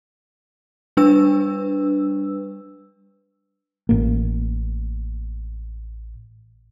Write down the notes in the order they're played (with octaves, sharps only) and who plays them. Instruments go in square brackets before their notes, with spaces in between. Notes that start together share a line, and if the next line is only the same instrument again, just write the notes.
[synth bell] G3 D4 B4 E6
[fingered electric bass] A1 A#3